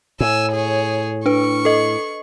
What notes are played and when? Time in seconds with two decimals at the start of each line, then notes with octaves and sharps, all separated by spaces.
0.20 A2 G#5 E6
0.52 G#4 C#5
1.26 D4 B4 C#6
1.65 A4 D#5